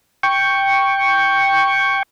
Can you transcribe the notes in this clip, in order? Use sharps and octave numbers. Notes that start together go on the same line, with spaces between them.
G5 C#6